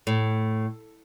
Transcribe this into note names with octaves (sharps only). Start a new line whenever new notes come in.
A2